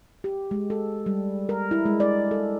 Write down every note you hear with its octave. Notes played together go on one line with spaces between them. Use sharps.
G4
G#3
A4
G3
A#4
E4
G#3
D5
A4